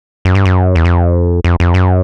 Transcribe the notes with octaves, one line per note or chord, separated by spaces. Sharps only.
F#2
G2
F#2
E2
F2
F2
F2
F#2